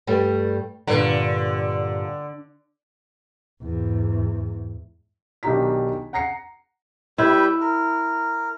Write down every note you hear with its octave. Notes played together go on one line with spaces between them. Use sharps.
G2 G3 A3
G2 A#2 D3
E2 G#2
B1 D#3 D4 G4 A#5 B6
F#5 A#5 A#6 C7 C#7
G3 E4 B4 G5
A#4